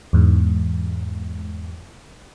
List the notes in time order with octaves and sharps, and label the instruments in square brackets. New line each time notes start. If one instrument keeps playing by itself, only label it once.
[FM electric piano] E2 G#2